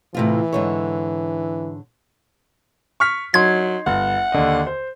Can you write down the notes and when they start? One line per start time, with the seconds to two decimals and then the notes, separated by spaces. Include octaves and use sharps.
0.14 A2 C3 E3 F4
0.53 G#2 D3 C#5
3.00 C#6 F6 B6
3.34 F#3 D#4 C6 G#6
3.87 G1 F#5
4.32 D#2 D3 D#5
4.66 C5